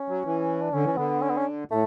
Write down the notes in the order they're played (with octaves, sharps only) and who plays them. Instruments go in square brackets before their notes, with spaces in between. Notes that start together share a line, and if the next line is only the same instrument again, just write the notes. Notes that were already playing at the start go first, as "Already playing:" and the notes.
Already playing: [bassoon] C#4
[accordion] F#3
E3
[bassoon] D4
[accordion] D3 [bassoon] C#4
[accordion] E3
[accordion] D3 [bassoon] B3
[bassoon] C#4
B3
C#4
[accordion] A2 [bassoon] A3